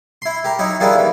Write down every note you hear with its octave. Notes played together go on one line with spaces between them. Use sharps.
E4 C6
G4 A#4
F#3 D#4 E4
D#3 F3 G3 D4 E4 G#4
D#2 E3